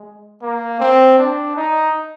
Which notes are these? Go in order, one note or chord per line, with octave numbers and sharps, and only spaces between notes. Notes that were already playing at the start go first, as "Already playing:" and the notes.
Already playing: G#3
A#3
C4
D4
D#4